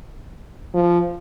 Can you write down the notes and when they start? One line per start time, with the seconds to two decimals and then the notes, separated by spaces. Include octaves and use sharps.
0.74 F3